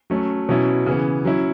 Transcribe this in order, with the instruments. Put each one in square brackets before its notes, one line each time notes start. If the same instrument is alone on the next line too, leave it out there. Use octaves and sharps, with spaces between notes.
[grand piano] F#3 A3 C#4
B2 F#3 C#4 E4
C#3 E3 B3
F#3 C#4 E4